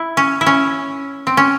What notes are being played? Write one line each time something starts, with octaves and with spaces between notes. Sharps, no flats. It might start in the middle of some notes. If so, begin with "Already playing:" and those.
Already playing: E4
C#4
E4
C#4
C4
C#4